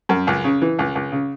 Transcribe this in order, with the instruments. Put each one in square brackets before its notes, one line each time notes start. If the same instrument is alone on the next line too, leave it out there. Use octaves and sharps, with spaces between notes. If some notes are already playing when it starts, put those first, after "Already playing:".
[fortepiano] F#2
C#2
C#3
E3
C#2
C#2
C#3